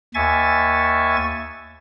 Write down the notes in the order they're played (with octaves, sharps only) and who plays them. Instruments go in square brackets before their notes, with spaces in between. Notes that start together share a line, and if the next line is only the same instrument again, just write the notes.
[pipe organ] D#2 E5 G#5 C#6 A6